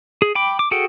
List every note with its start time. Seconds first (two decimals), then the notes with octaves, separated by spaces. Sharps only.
0.22 G#4
0.35 G5 B5 D6
0.59 D6
0.71 F#4 G#4 A4 F#5 G5